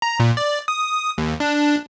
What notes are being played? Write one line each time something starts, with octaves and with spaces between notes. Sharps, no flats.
A#5
A#2
D5
D#6
D#2
D4